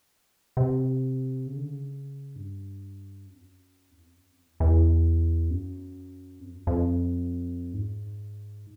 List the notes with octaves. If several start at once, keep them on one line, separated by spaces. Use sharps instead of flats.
C3
C#3
D3
C#3
G2
F#2
F2
F#2
E2
F2
F#2
F2
E2
E2
F#2
F2
F#2
F2
G#2